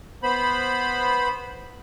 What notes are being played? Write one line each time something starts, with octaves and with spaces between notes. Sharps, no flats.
B3 C5 B5